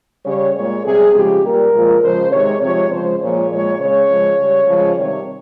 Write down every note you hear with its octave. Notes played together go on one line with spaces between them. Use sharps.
C#3 G3 C#5
A#2 G#3 C#5
C3 G3 G#4
C#3 F3 G#3 G4
A#2 G3 A#4
A#2 F3 G#3
C#3 F3 G#3 C5
C3 D#3 G#3 C#5
C3 F3 G#3 C#5
C#3 F3 G#3 C5
A#2 F3 G#3 C#5
A#2 F3 G#3 C#5
C#3 G#3 C#5
C#3 F3 G#3
C#3 G3
C#3 F3 G#3
C3 D#3 G3 C#5